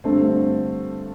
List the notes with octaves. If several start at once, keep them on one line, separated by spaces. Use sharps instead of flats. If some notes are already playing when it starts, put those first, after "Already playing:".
G2 D3 A3 C4